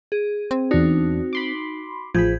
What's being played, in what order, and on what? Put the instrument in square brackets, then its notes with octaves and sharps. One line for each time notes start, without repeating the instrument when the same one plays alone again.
[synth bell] G#4
[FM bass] C4
[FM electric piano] E2 D4 [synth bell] D#4 F#4
[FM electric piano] B5 C6 D6
[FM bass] A1 [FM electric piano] F3 G#4 B5 [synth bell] G6 G#6